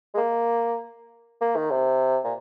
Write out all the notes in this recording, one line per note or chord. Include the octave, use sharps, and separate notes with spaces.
G#3
A#3
A#3
D#3
C3
A#2